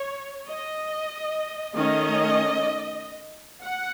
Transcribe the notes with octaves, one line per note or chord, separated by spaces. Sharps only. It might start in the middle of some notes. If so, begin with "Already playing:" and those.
Already playing: C#5
D#5
D#3 A3 C#4 D#5
F#5